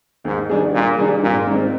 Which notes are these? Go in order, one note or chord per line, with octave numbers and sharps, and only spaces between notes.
D#2 G#2
D#3 G3 D4 G#4
D#2 A#2
D#3 G3 D4 G#4
G#1 A#2
G#2 D#3 G#3 C4